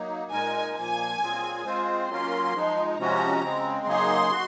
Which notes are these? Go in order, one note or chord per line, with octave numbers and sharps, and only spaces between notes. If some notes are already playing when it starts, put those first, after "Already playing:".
Already playing: F#3 A#3 D#4
A#2 G#3 D#4 A#4 G#5
A#2 F3 A#3 G#5
A#2 F#3 C4 F4 G#4
G#3 C4 F4 C5
F#3 A#3 C#4 F4 A#4 C6
F3 G#3 D#4
C3 F3 G#3 C#4 F#4 A#5
C#3 G#3 C4
C#3 F#3 A#3 D#4 G#4 C6
F#4